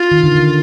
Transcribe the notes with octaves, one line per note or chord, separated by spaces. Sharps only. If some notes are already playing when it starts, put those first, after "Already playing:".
Already playing: F4
D#3
D3
D3